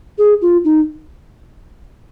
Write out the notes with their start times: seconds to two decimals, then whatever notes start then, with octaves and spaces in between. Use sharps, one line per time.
0.18 G#4
0.42 F4
0.64 D#4